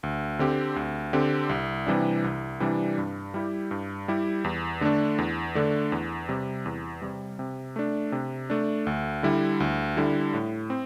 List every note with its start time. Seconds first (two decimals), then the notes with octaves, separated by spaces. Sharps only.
0.03 D2
0.39 D3 C4 G4
0.76 D2
1.13 D3 C4 G4
1.49 C2
1.86 C3 E3 G3 D4
2.24 C2
2.60 C3 E3 G3 D4
2.98 G2
3.34 G3 E4 G4
3.71 G2
4.08 G3 E4 G4
4.44 E2
4.81 D3 A3 D4
5.18 E2
5.55 D3 A3 D4
5.92 E2
6.29 C3 G3
6.66 E2
7.02 C3 G3
7.39 C3
7.76 A3 D4
8.12 C3
8.50 A3 D4
8.87 D2
9.23 D3 G3 E4
9.60 D2
9.97 D3 G3 E4
10.34 A2
10.70 C4